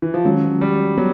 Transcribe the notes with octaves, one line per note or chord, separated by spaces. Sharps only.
E3
F3
D#3 F#3 G#3 C#4
G3
F#3 B3